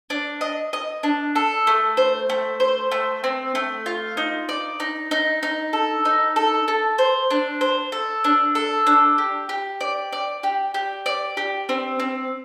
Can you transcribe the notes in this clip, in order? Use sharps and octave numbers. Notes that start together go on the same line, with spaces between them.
D4
D#5
D#5
D4
A4
A3
C5
A3
C5
A3
C4
A3
F4
D#4
D5
D#4
D#4
D#4
A4
D#4
A4
A4
C5
D4
C5
A4
D4
A4
D4
G4
G4
D5
D5
G4
G4
D5
G4
C4
C4